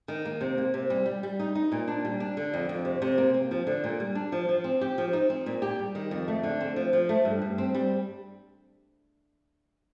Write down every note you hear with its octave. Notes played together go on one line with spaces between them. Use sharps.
D#3
A#3
C3
A#3
C3
G3
G3
G3
D#4
D#4
A#2
D4
G3
D4
D3
F2
F2
C3
C3
A#3
C4
F3
D3
A#2
G3
D4
F3
F3
C4
G4
F3
D#4
C4
A#2
G4
G3
D#3
F2
A3
D3
C4
F3
F3
A3
G2
G2
C4
G3